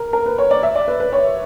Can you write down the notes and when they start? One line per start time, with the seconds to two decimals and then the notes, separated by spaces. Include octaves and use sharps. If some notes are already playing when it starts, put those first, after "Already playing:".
Already playing: A#4
0.13 A#4
0.26 B4
0.38 C#5
0.51 D5
0.63 E5
0.75 D5
0.88 B4
1.00 B4
1.13 C#5